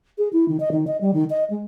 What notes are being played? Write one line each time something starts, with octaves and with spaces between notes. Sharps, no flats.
G#4
E4
D#3
D#5
D#3
D#5
G3
D#3
D#5
G#3